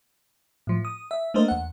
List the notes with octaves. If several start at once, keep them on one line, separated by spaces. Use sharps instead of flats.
A2 F3
D#6
E5
A3 A#3 D4 A#4 C5 D#5
E2 F#5